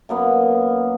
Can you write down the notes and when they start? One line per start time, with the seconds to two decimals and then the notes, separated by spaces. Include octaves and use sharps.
0.09 F#2 A#3 B3